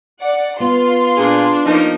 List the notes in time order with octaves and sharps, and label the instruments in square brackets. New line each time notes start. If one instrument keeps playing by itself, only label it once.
[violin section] D5 F#5
[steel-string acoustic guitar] B3 [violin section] F4 C6
[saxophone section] A#2 G#4 [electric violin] D4
[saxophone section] F3 A#3 D#4